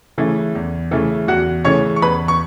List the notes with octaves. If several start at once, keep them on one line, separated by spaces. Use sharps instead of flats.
C#3 E3 A3
E2
C#3 E3 A3
E2 F#4 F#5
C#3 E3 A3 C#5 C#6
C#6
E2 B4 B5
C#6